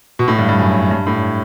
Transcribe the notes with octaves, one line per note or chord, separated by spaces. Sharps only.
B2
A2
G2
G2
F#2
G2
A2